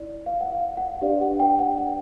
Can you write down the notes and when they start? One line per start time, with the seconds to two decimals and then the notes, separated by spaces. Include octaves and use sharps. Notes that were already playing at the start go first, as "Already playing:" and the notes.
Already playing: E4 D5
0.26 F5
0.41 F#5
0.52 F5
0.77 F#5
1.01 D4 G4 B4 D5 F5
1.21 F#5
1.40 G5
1.59 F#5
1.78 F#5